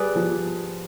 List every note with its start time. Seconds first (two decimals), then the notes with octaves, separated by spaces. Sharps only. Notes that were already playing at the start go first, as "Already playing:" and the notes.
Already playing: G3 G#4 B4 D5
0.16 F3